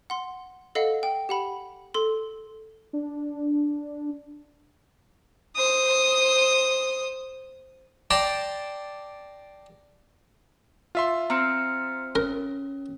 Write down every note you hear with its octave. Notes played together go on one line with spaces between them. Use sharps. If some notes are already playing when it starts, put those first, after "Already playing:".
F#5 C6
A4 D#5 F5 F#5
G5
G4 F#5 B5
A4 C6
D4
C5 D#6
D5 G5 A5 A#5 C6 D6
F4 E5 C6
C4 A#5 F6 C#7
C#4 A#4